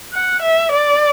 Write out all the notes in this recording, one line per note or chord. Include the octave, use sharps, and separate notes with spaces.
F#5
E5
D5